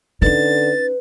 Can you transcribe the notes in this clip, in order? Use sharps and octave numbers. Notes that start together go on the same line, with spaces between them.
D3 C#4 D#4 B4 A6